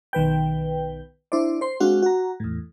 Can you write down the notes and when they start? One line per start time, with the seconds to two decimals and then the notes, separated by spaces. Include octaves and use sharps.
0.13 B1 D#3 B4 G5
1.32 D4 E4 C5 D5
1.61 C5 C6
1.80 G#3 C4 D4 F#4 F5
2.02 F#4 A#5
2.40 E2 A2